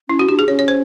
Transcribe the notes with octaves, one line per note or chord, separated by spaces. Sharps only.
C#4 E4
F#4
D4 G4
G#4
C#4 C#5
C#5
C5